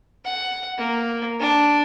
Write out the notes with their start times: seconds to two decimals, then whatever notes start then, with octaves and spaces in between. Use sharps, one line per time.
0.25 F#5
0.78 A#3
1.40 D4